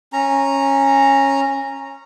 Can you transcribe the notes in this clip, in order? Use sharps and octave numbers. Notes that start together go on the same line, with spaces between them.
C#4 A#5